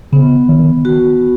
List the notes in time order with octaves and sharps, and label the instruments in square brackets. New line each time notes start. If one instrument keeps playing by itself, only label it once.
[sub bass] C#3 [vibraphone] B3
[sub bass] D#3
[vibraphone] F#4